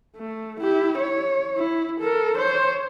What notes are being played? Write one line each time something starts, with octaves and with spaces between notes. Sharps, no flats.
A3
E4 G4
C#5
E4
A4 A#4
C5 C#5